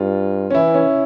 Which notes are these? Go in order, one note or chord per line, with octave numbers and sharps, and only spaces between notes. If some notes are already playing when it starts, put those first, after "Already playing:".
Already playing: G2 F4
C#4
E3 E4
C#4